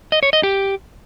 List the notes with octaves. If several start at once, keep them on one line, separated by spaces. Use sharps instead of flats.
D#5
C#5
D#5
G4